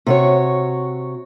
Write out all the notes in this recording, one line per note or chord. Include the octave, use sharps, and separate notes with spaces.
C3 F#4 C#5